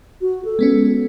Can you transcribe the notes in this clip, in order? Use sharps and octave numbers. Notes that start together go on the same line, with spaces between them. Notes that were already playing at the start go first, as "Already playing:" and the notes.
F#4
A4
G#3 B3 C#4